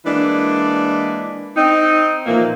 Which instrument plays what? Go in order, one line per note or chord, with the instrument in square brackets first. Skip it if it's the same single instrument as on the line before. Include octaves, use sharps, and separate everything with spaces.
[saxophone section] E3 G#3 A#3 D4
C4 D#4
A#2 E3 F3 A#3